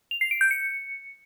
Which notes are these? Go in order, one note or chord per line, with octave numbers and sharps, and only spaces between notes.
F7
C7
D7
G6
C#7